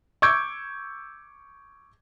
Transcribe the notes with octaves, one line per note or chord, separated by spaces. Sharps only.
C#6 D6 E6 G6 G#6 D7